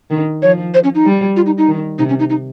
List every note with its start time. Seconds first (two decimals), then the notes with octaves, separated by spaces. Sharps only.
0.11 D#3
0.42 F3 C#5
0.74 C5
0.84 C#4
0.95 D#4
1.06 G3
1.36 F4
1.46 D#4
1.58 D#4
1.68 D#3
1.99 C3 D#4
2.09 C#4
2.19 D#4
2.30 D#4